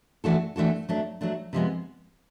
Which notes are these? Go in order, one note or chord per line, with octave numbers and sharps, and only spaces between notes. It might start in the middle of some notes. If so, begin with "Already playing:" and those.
E3 A3 D4 F#4 A4
E3 A3 D4 F#4 A4
F#3 A3 D4
F#3 A3 D4
C3 F3 G#3 B3